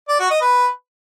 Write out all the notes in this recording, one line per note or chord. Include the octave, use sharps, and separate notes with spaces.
D5
F#4
D#5
B4